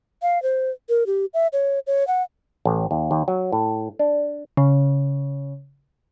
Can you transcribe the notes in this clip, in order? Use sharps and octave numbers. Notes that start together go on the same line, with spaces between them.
F5
C5
A#4
G4
E5
C#5
C#5
F#5
A1
D#2
D#2
F#3
A2
D4
C#3